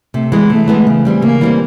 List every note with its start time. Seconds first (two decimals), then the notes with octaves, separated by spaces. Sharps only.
0.14 C3 A3
0.32 E3 G#3 B3
0.50 C3 A3
0.68 E3 G#3 B3
0.87 C#3
1.05 E3 G3 C4
1.22 C#3 A#3
1.41 E3 G3 C4